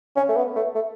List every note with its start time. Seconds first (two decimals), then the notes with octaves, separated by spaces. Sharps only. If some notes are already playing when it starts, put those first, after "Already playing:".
0.16 C#4
0.29 A3
0.36 B3
0.56 A3
0.75 A3